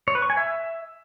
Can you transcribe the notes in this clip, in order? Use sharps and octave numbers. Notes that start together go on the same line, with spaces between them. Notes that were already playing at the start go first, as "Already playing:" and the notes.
C#5
B4
C#6
G#5
E5